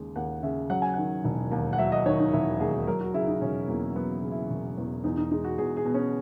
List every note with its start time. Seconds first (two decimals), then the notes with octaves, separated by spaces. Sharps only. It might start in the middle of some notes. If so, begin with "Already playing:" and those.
Already playing: D#2 C#3 G#3
0.16 D#2 F#5
0.43 C#3 E5
0.70 F#3 F#5
0.82 G#5
0.94 D#3 F#5
1.25 E1
1.51 D#2
1.73 F#5
1.78 F#3 E5
1.92 D#5
2.06 D#3 C#5
2.19 D#4
2.33 E1 E4
2.59 D#2 G#4
2.87 F#3 A#4
3.01 F#4
3.14 C#3 E4
3.27 D#4
3.41 E1 C#4
3.68 E2 A#3
3.96 F#3 B3
4.23 C#3
4.31 E4
4.50 E1
4.77 E2
5.04 E2 D#4
5.17 D#4
5.31 G#3 D#4
5.44 F#4
5.58 E2 G#4
5.77 G#4
5.85 B2
5.94 C#4